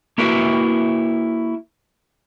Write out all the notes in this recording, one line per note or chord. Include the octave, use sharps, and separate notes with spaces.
A#3 E4 F#4 A#4 B4 E5